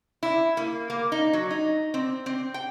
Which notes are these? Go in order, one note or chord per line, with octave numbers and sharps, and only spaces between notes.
E4
A#3
A#3
D#4
F#3
D#4
C4
C4
G5